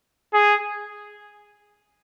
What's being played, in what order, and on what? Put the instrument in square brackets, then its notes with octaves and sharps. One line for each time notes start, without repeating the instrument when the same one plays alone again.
[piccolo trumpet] G#4